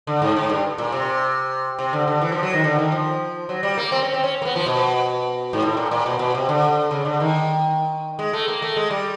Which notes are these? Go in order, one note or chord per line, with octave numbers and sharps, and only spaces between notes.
D3
G#2
G#2
G2
A#2
C3
C3
D3
D3
E3
F3
F#3
D#3
D3
D#3
F3
F#3
G3
A#3
C4
C#4
C4
C#4
A#3
B3
F3
B2
G#2
A2
A#2
A#2
B2
B2
C3
D3
C#3
D3
D#3
G#3
A3
A#3
A3
G#3
G3